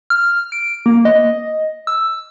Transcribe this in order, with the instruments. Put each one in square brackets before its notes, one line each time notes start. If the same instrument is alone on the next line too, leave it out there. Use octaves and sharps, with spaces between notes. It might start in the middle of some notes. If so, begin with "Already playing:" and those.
[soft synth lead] F6
D7
A#3
D#5
E6